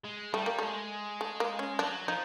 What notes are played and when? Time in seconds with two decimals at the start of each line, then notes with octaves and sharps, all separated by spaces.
0.04 G#3
0.34 G3 A3
0.46 A#3
0.59 G#3 A3
1.21 A3
1.40 A#3
1.59 C#4
1.79 F#3 D4
2.08 F3 D#4